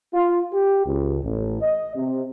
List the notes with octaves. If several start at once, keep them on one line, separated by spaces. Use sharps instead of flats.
F4
G4
C#2
A1
D#5
C3